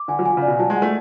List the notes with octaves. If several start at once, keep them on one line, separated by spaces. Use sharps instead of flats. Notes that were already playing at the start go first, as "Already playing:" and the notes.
Already playing: D6
D3 G#5
F#3
F3 G#5
C#3
B2 D5
F#3 A5
G#3
F#5
A3